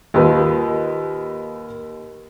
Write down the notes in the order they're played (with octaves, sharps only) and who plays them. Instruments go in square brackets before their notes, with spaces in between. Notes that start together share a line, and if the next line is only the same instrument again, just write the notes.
[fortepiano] D#2 [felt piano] F4 A#4 B4